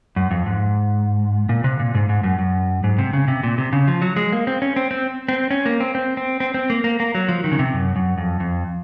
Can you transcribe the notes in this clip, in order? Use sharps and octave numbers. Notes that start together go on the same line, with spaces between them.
F#2
F2
G#2
A#2
C3
A#2
G#2
G#2
F#2
F#2
G#2
C3
C#3
C3
A#2
C3
C#3
F3
F#3
G#3
A#3
C4
C#4
C4
C4
C4
C#4
A#3
C4
C4
C4
C4
C4
A#3
A#3
A#3
F#3
F3
D#3
C#3
C3
F#2
F#2
F2
F2